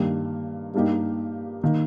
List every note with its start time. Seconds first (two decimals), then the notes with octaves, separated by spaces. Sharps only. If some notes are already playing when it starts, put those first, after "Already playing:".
Already playing: G2 D#3 A#3 G4
0.74 G2 G3 A#3 D#4 G4
1.64 D#3 A#3